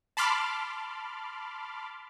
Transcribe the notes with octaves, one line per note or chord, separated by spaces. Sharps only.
A5 B5 C6 D6 F6